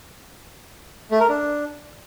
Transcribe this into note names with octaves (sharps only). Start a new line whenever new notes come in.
A3
A#4
D4